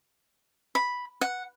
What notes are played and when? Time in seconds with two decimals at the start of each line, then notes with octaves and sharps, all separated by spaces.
0.75 B5
1.21 F#5